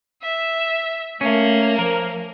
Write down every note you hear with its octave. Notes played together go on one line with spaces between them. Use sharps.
E5
A3 A#3 C#4
F3 A#4